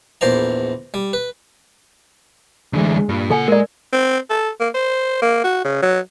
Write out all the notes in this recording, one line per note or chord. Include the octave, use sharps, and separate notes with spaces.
A#1 E2 C5 D5 A#5
G3
B4
D2 D3 E3 G#3
G#3
G2 A#2
C#3 A4 F#5 G#5
G#3 A#4 D5
C4
A4
A#3
C5
A#3
F#4
C#3
F#3